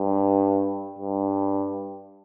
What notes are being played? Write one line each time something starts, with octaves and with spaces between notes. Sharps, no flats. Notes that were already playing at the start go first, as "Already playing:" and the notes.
Already playing: G2
G2